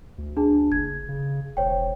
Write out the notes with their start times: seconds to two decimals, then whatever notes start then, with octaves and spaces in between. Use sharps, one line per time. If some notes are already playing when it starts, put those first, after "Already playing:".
0.18 D2
0.37 D4 G#4 A5
0.72 F#1 G#6
1.09 C#3
1.57 E1 C5 C#5 G5